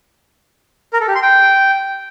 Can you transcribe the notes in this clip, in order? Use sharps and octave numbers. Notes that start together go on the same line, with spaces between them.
A#4
A4
G4
C6
G5